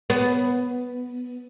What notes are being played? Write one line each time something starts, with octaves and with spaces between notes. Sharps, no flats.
B3